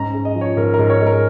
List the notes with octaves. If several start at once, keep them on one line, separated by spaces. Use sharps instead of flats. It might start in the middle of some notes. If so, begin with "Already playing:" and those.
Already playing: G#2 C#4 A#5
G#3
D#5
F3
C#5
G#2 A#4
A#4
G#2
C#5
G#3
A#4